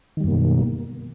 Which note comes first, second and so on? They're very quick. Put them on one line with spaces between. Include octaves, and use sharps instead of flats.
D#3 G3 F#2 A#3 B2